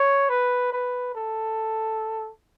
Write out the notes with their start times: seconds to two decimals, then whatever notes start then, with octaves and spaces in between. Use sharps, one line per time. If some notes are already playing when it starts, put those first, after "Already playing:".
Already playing: C#5
0.29 B4
0.73 B4
1.15 A4